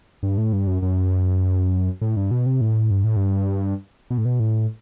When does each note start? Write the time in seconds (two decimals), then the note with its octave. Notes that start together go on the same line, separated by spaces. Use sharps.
0.23 G2
0.38 A2
0.53 G2
0.67 F#2
0.82 F#2
2.01 A2
2.17 G2
2.31 B2
2.46 C3
2.61 A2
2.91 G2
3.04 A2
3.16 G2
4.10 B2
4.18 A2
4.25 B2
4.40 A2